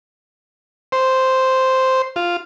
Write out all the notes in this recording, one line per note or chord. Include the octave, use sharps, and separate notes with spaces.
C5
F4